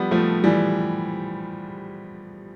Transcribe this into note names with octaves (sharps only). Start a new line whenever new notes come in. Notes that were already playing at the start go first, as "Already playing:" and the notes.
Already playing: F3 G3 B3
F3 A3
E3 G3